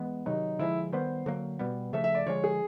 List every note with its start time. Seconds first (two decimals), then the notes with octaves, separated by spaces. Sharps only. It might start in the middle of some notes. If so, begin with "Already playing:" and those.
Already playing: E3 G#3 B3
0.26 C3 D#3 F#3 D#4
0.59 D3 F3 G#3 E4
0.93 D#3 G3 B3 C5
1.26 D3 F#3 A#3
1.59 B2 G3 B3
1.93 C#3 F3 A3 E5
2.04 E5
2.15 D5
2.26 D3 F3 G#3 C#5
2.44 G#4